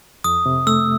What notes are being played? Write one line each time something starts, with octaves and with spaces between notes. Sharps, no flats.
F2 D#6
C3
A3 E6